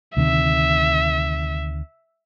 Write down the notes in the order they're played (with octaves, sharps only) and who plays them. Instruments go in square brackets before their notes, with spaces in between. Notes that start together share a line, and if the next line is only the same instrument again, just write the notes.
[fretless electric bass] D2 C3 D#3 [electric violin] E5